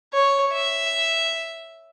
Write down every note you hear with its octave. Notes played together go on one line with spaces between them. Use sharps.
C#5
E5